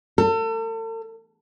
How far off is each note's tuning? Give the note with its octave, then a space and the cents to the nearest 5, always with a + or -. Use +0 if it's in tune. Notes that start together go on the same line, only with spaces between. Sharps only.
A4 +40